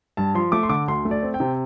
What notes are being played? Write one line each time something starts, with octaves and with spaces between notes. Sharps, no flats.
G2 A5
F3 C6
A3 D6
C6
D3 D6
D2 C6
A3
D5
C4
G5
C3